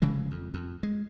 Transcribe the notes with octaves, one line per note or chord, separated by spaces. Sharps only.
F1 C#3 E3 G#3
F2
F2
G#3